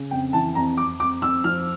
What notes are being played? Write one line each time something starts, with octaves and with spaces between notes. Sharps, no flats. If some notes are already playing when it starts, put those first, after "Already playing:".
Already playing: C#3
F2 G5
E3 A5
F2 A#5
F2 D6
F2 D6
F2 E6
F3 F6